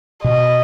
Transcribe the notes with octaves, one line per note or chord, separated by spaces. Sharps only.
B2 D#5